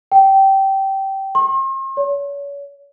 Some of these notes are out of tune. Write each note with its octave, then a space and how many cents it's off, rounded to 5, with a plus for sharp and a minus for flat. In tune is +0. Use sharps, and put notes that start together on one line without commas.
G5 -15
C6 +45
C#5 +35